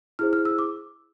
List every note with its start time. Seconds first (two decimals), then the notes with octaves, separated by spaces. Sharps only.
0.19 E4 G#4 C5 F6
0.33 F6
0.45 E6
0.59 D6